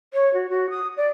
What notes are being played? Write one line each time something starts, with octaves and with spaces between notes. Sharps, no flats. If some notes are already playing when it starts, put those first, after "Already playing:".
C#5
F#4
F#4
D#6
D5